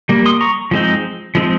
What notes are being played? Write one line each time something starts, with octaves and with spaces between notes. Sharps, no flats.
G3 A#3
C6 D#6
A#5 C#6
F3 G#3 C4 D#4
F3 G#3 C4 D#4